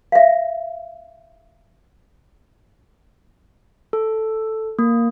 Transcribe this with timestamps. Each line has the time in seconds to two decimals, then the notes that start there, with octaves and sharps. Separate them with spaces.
0.12 E5 F5
3.93 A4
4.79 A#3